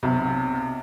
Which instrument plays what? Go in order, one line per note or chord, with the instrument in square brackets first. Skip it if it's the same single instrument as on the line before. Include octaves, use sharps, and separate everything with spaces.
[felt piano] B1 C3